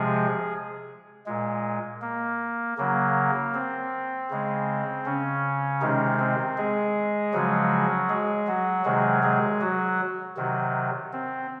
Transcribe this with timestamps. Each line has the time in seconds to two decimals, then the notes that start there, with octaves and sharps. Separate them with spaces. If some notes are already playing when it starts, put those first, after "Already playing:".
Already playing: C3 F3 G#3 G#4
1.26 A#2 G#3
2.02 A#3
2.77 C#3 F#3 A#3
3.54 C4
4.30 C#3 G#3
5.06 C#3 C#4
5.81 C3 D#3 G#3 D#4
6.19 C4
6.58 G#3 G#4
7.33 C#3 F3 F#3 G#3 F#4
8.09 G#3 G#4
8.47 F#3 F#4
8.85 C3 D#3 F#3 G#3 G#4
9.23 G#3 G#4
9.61 F#3 F#4
10.37 C3 D#3 F#3
11.13 C4